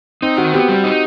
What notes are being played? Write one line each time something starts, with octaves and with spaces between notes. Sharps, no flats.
C4 D#4
D#3 F#4
B3 G4
G3
D#4